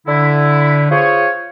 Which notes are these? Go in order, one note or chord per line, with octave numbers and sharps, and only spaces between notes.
D3 E4
F4 G#4 C5 C#5